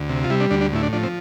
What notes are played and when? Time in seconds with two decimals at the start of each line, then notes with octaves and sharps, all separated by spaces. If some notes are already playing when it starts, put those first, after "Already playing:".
Already playing: D2
0.09 C3
0.24 F4
0.30 G3 E4
0.40 D4
0.50 D2 D4
0.61 D4
0.73 A2 E4
0.83 D4
0.93 F3 D4
1.03 C4